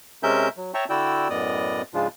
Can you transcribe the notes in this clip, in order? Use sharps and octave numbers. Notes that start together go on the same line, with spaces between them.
C3 G#3 C#4 A#4 E5 G6
F#3
C#5 E5 G5 A5 A#5 C#6
D3 E4 F#4 D5 G5 E6
F#2 A2 B3 D5 D#5 D#6
G#2 C#3 F3 G#3 D4 F4